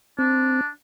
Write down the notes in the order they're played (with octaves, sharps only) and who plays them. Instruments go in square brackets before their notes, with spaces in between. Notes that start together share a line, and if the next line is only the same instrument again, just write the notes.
[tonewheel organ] C4 [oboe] D4